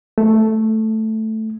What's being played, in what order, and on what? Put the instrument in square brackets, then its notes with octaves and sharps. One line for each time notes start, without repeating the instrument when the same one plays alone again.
[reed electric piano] A3